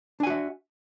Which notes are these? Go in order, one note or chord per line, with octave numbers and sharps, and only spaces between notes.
D4 F#4 E5 G#5